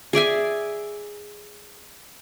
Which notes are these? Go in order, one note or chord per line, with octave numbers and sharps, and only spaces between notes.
G#4 D5 E5 G#5